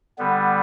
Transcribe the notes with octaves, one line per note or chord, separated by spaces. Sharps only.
D3 G3 B3